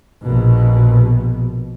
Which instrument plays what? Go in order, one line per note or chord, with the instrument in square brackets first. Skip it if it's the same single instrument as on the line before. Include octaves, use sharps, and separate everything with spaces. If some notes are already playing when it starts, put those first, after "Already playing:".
[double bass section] A#1 B2